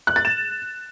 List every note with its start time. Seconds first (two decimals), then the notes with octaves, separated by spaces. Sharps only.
0.07 F#6
0.16 A6
0.25 E7